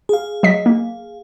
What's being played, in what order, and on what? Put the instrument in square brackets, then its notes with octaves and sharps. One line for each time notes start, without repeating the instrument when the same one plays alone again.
[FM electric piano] G#4 F5
[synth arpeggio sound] F#3 D#5 B6
A#3